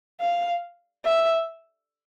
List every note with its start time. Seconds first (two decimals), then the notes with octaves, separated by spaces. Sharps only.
0.21 F5
1.04 E5